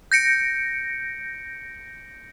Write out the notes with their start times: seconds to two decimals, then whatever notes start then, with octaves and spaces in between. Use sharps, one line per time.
0.12 G6 A#6 C#7 D7